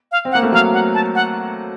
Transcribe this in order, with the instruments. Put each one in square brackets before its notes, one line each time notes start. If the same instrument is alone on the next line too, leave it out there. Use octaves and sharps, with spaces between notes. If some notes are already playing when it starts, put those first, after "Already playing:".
[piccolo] F5
[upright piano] C4
[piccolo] F#5
[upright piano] A#3
A3
[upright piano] F#3 [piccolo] F5
[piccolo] F#5
A5
F#5